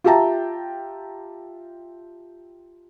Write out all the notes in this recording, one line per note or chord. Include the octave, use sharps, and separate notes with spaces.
F4 G4 E5 G5 A5 A#5